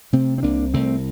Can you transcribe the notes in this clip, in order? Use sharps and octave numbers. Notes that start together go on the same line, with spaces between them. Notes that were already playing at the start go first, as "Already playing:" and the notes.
C3 A3 C4
C4
C2 A#3 D4
C2 A3 C4